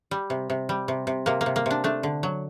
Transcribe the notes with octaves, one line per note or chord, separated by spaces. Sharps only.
G3
C3
C3
G3
C3
C3
C3 A#3
A#3
C3
A#3
C3 D4
A3 D4
D3
F#3